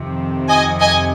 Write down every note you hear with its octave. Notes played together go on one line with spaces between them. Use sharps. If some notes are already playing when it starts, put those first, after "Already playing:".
Already playing: F2 C3 D#3
D#5 G#5
D#5 G#5